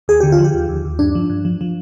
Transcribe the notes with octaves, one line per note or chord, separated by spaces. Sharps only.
D#2 G#4
D3 G4
F4
F3
G4
D#2
D#2
D#2
G2 D4
F3
G2
F3
F3